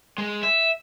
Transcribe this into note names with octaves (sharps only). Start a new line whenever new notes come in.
G#3
E5